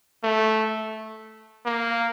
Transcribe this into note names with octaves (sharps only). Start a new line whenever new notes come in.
A3
A#3